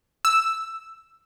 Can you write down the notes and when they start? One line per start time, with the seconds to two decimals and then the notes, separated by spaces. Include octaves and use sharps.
0.25 E6